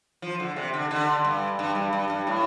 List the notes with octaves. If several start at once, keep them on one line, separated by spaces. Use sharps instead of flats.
F3
D3
C3
D3
D3
G2
G2
G2
G2
G2
A2